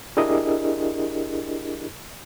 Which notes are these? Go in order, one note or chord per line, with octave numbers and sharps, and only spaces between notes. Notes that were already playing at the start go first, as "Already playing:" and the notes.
D4 E4 G4 G#4 A#4 D#5